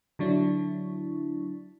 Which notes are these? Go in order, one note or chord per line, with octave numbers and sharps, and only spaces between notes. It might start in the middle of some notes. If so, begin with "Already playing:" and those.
D3 F#3 D4 E4